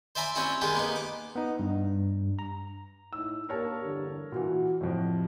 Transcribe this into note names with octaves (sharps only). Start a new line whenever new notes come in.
C5 D5 E5 G#5 A#5 B5
G3 C4 C#4 E4 F#4
D#3 G3 G#3 G4 G#4
A#3 B3 D#4
D6
B3 D#4
G2
A#5
A2 D#4 E6
A#3 D4 G4 A#4 C#5 A5
E2 G2 D3
A#2 E3 F#4
F2 A2 C3